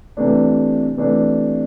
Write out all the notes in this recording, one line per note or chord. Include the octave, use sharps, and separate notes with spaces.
C3 E3 A3 D4
C3 E3 A3 D4